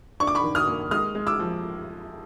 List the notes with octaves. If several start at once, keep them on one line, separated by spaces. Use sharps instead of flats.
D4 C#6
D6
B5 C#6
D#3
D#6 F6
A#3
G#3 D#6 F6
G#3
D6 E6
F3